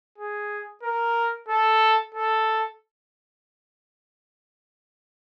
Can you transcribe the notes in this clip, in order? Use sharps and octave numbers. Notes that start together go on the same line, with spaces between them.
G#4
A#4
A4
A4